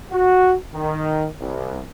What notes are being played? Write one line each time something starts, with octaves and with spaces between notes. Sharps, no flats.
F#4
D#3
C2